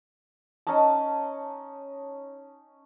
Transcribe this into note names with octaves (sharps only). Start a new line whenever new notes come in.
C#4 D#4 D#5 A5